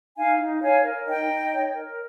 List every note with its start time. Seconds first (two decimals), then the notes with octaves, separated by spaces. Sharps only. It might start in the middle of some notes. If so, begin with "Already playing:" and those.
0.17 D#4 F5 G#5
0.39 D#4
0.62 C#5 F5 G#5
0.85 A#4
1.06 D#4 D#5 G5
1.29 D#4
1.52 C#5
1.74 A#4